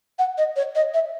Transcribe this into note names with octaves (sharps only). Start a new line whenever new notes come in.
F#5
D#5
C#5
D#5
E5